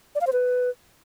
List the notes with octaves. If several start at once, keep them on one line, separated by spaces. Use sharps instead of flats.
D5
F5
C5
B4